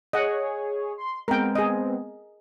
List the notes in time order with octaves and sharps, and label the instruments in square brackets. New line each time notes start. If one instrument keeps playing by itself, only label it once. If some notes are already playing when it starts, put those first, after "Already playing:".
[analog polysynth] G#4 C#5 [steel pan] D#5 F#5
[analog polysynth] C6
[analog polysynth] G#3 B3 C4 [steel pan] A#4 G5
[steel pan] G#4 D#5